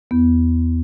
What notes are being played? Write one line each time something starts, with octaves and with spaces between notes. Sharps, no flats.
E2 B3